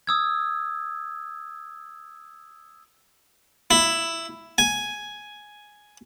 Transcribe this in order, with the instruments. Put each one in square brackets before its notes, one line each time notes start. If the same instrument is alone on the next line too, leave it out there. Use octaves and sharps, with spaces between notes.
[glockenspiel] D#6 E6 G#6
[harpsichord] E4
G#5